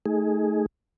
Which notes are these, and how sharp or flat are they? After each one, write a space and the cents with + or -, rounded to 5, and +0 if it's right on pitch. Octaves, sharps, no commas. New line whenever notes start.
A3 -5 D#4 +15 G#4 +0